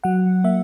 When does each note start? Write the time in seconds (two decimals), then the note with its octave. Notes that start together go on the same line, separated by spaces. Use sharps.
0.04 F#3 F#5
0.44 A#3 E5